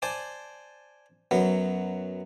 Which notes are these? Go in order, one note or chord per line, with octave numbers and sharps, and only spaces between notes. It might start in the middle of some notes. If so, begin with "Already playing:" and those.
C5 D5 G#5 A5
F#2 F#3 B3